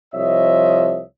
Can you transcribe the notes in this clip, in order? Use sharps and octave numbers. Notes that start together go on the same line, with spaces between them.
C2 F3 C#5 D#5 E5